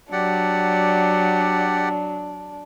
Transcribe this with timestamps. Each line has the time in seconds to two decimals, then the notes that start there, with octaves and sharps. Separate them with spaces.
0.12 F#3 D4 G4 D5 F#5